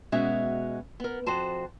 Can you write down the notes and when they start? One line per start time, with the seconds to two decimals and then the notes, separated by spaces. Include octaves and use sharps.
0.12 B2 G#3 C#4 F#4 E5
1.00 B3 A#4
1.26 F2 F#4 C5 A5